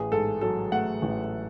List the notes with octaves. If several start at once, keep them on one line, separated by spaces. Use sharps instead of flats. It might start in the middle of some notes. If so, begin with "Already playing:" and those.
Already playing: A1 G#4
G#2 A4
F#3 A4
A3 F#5
A1